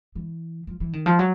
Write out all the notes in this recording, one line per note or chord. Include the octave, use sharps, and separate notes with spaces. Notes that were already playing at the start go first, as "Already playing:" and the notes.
E3
F3
E3
D#3
F3
F#3